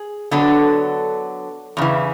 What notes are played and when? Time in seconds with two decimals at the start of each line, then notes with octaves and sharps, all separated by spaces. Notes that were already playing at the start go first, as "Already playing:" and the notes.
Already playing: G#4
0.31 D3 F#3 B3 D4 A4
1.77 E2 C#3 E3